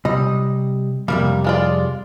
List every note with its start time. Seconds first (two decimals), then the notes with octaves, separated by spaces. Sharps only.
0.05 C3 G3 D#5
1.08 F2 C3 G3 A#3
1.44 G#3 F4 D5